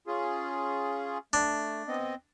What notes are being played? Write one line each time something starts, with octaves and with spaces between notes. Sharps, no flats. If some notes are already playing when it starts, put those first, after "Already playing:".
C#4 F4 G#4
A3 D4
B3 C4 D#5